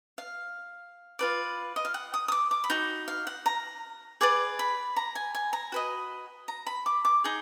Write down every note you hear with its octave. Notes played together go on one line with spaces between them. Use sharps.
F5
F4 B4 D5
D#5
F5
F#5
D#6
D#6
D6
D6
B5
D#4 F#4
F5
F#5
A#5
G#4 B4 D5 D6
B5
A#5
G#5
G#5
A#5
F#4 B4 D#5
A#5
B5
D6
D6
D#4 G#4